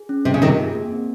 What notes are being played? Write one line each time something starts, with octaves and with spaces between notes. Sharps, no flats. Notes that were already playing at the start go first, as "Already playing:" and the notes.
Already playing: G#4
C#4
C3 D#5
C#3
C3 D#3 F4
G#4
A#3
C4